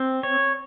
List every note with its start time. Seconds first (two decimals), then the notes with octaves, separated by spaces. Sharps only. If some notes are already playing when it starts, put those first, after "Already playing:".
Already playing: C4
0.23 C#5